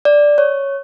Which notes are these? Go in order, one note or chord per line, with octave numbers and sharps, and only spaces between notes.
D5
C#5